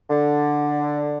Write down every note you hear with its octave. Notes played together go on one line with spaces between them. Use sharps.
D3